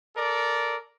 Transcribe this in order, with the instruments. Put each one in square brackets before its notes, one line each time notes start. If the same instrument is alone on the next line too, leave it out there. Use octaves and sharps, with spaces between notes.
[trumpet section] A4 A#4 D5